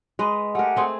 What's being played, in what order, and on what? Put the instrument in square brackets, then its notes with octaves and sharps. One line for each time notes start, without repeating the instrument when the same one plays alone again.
[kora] G#3 B4 D#5
[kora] A3 A#4 [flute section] G4 F#5 G#5
[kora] A3 C4 G#4